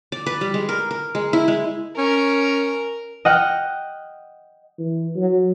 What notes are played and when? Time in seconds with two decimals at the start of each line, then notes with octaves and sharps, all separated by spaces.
0.12 D5
0.26 B4
0.41 G3
0.54 G#3
0.69 A#4
0.91 A#4
1.15 G#3
1.33 E4
1.48 G#3
1.98 C#4 A#4
3.25 D#5 F#5 G5 F6 G6
4.78 E3
5.16 F#3